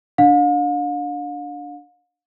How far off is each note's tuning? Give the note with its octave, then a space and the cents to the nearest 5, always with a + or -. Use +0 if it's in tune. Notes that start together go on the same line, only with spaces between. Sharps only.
D4 +0 F5 +40